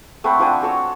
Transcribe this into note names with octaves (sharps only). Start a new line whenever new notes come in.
A3 C4 F#5 B5
F3 C4 D4 G#5
F#4 A4 C#5 A5